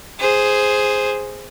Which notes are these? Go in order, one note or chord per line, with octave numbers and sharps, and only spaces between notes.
G#4 C5